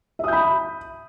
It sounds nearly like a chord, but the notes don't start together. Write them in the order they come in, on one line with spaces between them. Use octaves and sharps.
E5 D#6 G6 B5